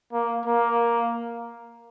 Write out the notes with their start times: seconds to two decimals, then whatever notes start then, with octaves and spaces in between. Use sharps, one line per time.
0.13 A#3
0.45 A#3